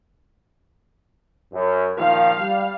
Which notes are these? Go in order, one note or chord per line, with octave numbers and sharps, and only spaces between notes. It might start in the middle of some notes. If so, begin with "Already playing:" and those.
F#2
A#2 D#3 F3 F5
G3